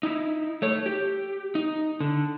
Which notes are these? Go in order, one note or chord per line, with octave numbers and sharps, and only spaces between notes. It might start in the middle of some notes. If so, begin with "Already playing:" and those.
D#4 E4
A3 C#5
G4
D#4
D3